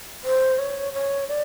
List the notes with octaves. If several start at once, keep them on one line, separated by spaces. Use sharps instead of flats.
C5
C#5
C#5
D5